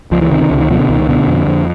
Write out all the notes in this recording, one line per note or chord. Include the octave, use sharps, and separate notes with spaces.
C#2 F3
E3
C3 D#3
D#3
C#2 D3
D#3
B2 F3
D3
C#2 D#3
B2 D3
F2
F2